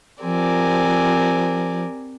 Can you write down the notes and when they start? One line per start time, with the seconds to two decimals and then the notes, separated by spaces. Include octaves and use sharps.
0.23 F3 C4 G4 A#4 D5 G#5